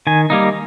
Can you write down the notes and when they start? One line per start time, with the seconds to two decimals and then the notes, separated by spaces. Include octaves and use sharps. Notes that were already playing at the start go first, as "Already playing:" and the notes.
0.07 D#3 G#5
0.30 G3 A#3 D#4